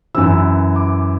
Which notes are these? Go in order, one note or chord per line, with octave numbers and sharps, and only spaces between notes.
F#2 E3 E6
D6